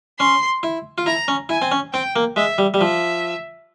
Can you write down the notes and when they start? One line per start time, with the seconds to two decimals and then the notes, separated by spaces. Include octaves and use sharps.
0.19 C#4 C6
0.63 E4
0.98 F4
1.06 E4 A#5
1.28 C#4
1.49 E4 G#5
1.62 C4
1.71 C#4
1.93 C4 G5
2.16 A#3
2.36 G#3 E5
2.58 G3
2.74 G3
2.80 F3 E5